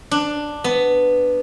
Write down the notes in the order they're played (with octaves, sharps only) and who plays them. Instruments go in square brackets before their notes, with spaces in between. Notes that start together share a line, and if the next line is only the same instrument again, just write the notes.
[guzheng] D4
B3